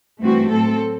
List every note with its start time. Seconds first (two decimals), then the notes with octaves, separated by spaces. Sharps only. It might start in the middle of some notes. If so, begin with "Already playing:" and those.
0.21 G2 E3 A3 C4 F#4
0.50 A2 F#3 C4 A4